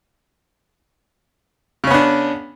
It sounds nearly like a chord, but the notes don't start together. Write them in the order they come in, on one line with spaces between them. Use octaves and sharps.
C#3 C#4 B3 D4